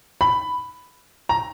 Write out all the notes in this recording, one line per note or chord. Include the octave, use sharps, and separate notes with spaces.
B5
A#5